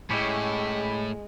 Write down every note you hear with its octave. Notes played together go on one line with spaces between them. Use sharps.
A2 G#3 C#4 E4 G4